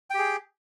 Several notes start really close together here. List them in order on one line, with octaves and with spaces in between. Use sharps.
G5 G4 G#4